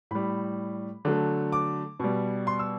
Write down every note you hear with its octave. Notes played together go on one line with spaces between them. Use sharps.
A2 G3 B5
D3 F#3 A3
D6
B2 G3
C6
E6